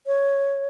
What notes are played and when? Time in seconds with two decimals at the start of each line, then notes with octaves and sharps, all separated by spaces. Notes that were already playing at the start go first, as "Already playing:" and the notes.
0.07 C#5